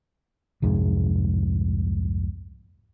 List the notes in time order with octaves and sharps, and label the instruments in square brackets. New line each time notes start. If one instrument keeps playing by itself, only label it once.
[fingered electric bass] C2 F2 G#2 G#3